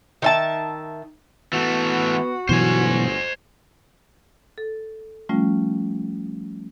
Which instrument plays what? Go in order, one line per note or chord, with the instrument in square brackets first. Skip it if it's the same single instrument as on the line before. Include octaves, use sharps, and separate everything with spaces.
[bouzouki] D#3 E5 A5
[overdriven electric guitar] E3 A3 [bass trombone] B3 [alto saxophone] F#4
[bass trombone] G1 [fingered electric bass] B2 E3 F#3 [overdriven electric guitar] C5 G#5
[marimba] A4
F3 G3 A3 C#4 F4